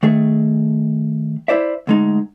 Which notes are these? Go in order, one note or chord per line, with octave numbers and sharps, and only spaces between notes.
D#3 A3 G#4
E4 C5 D5 E5
D2 G#3 D#4